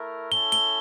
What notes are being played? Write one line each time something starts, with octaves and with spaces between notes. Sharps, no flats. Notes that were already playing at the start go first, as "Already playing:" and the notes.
Already playing: A3 E4 A#4
C#4 E4 A4 G7
G7